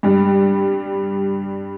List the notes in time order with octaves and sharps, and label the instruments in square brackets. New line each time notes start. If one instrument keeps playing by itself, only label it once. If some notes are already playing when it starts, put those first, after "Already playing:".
[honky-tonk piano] G2 G3